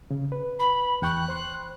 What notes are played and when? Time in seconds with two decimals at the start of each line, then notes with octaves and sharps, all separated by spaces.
0.11 C#3
0.32 B4
0.59 B5
1.02 E2 G5 C#6 F#6
1.28 C5 C6